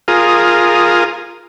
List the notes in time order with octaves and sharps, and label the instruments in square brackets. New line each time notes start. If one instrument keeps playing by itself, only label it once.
[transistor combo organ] F4 G#4 A#4 D#6